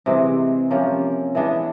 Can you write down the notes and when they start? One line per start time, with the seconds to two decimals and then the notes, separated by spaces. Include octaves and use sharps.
0.06 C3 E3 G#3 C4
0.71 C3 F3 A#3 C#4
1.35 E3 G#3 B3 D4